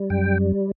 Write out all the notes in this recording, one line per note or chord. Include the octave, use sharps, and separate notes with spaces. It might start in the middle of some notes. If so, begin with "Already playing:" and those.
Already playing: G3
F#2 G5